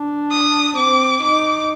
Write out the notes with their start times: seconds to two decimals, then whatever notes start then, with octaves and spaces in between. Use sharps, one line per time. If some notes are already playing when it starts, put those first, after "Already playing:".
Already playing: D4
0.31 D#6
0.77 C4 D6
1.22 D#4 D6